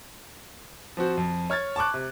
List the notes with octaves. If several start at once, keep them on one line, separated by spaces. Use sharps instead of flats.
F3 C4 F#4
F2
C#5 F6 G#6 A6
A5 C#6 D6 F#6
C3